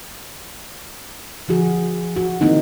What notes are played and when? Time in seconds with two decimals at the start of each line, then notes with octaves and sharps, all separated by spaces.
1.48 D3 F3 F#4 G#4
2.16 F#4
2.40 D3 D#3 A#3 C4 D#4 E4